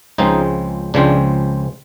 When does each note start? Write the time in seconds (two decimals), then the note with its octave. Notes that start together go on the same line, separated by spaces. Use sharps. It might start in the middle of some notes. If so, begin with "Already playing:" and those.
0.18 C#2 C#3 F3 G#3 C4 D#4
0.94 C#2 C#3 F3 G#3 C4 D4